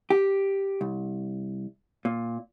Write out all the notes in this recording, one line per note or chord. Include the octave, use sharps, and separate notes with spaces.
G4
C2
A#2